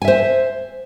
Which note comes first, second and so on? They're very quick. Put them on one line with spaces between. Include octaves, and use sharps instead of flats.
G#5 E5 C5